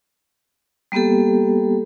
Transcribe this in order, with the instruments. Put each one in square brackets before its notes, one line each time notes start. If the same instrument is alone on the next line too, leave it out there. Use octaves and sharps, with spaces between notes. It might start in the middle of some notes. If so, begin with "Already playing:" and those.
[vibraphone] G3 A#3 B3 G4 A4